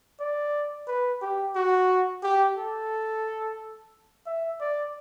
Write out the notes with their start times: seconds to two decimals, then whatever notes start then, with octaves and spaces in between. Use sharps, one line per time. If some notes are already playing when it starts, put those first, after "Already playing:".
0.20 D5
0.87 B4
1.21 G4
1.56 F#4
2.23 G4
2.57 A4
4.26 E5
4.60 D5